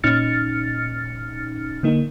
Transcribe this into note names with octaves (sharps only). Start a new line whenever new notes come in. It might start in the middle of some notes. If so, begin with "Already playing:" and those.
A#2 C#4 D#4 F6 A6 C#7
D3 A#3 D#4